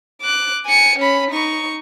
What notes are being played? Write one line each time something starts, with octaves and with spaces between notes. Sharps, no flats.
D6 F#6
G#5 C#7
C#4 B5
D#4 C#6